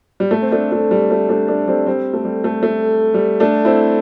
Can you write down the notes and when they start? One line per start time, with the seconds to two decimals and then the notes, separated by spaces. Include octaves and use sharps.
0.20 G3
0.31 A3
0.42 C4
0.52 A3 D4
0.72 A3
0.91 G3
1.11 A3
1.29 A3 D4
1.48 A3 D4
1.68 G3 C4
1.86 G3 C4
2.13 A3
2.25 G3
2.44 A3
2.63 A3
3.14 G3
3.40 A3 D4
3.65 C4 E4